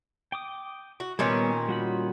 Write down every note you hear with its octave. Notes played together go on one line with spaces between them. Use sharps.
G5 D6 D#6
F#4
A#2 D#3 G3 B3 C#4
G3 F#4 B5